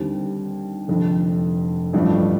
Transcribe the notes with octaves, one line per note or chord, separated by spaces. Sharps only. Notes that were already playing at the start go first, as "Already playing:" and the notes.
Already playing: D#2 D3 G3 C4
F1 F2 D3
A1 G2 F3 A3 D4